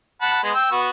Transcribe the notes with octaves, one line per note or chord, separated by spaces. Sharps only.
F#5 A5 B5
G#3 B3
G5 E6
B3 F#4